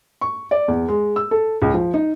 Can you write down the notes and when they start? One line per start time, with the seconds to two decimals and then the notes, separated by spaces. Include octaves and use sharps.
0.21 C#6
0.51 D5
0.68 E2
0.88 G#3
1.16 E6
1.31 A4
1.62 C#2
1.74 F3
1.94 D#4